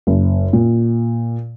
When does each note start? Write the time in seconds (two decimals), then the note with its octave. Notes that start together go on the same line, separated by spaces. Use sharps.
0.07 F#1
0.53 A#2